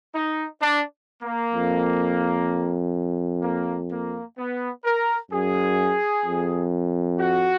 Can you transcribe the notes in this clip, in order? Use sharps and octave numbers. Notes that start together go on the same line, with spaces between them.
D#4
D4
A#3
F2
A#3
A#3
B3
A#4
F#2 G#4
F2
F#4